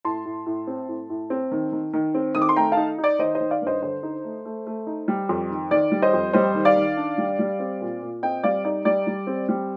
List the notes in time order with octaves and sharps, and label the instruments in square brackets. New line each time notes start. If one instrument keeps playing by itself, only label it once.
[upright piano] A2 A5 C6
A2
A2
C4
A2
A2
C4
D#3
D#3
D#3
C4
D#3 D#6
D6
C6
A3 G5 A#5
D#4 F5 A5
D#4
D5
D#3 C5 D#5
C5 D#5
D#3
D5 F5
G2 C5 D#5
D3 C5
D#4
A3
A3
A3
D#4
G3
F2
D#3
D#3 D5
G3
C5 D#5
F2
G3 C5 D#5
D#3
D5 F5
D#3
D4
G3
G3
C4
A#2
A#2
C4 D#5 G5
G3 D5 F5
D#4 D5
G3 D5
G3
C4
G3